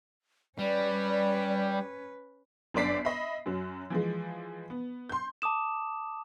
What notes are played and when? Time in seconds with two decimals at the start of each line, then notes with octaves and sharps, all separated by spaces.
0.59 G3 C#4 B4 D5
2.74 G1 F#2 D4 D5 B6 C7
3.05 D#5 E5 B5
3.46 F#2 F#3
3.90 E3 F3 G#3
4.70 B3
5.09 C6 G6
5.42 A5 D6 D#6 E7